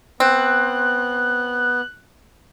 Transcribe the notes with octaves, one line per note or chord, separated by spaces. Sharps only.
B3 C4 F#6